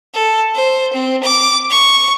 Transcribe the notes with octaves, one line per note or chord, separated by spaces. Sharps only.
A4
C5
C4
D6
C#6